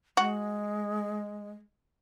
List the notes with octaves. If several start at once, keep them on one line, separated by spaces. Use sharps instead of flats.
G#3 F#4